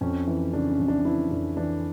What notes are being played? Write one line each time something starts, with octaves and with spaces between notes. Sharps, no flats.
F2 C#4
E3
C#3 D4
C#4
F2
D4
E3 E4
F2 D4
E3 D4